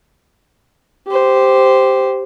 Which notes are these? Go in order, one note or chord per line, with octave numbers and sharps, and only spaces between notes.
G4 C5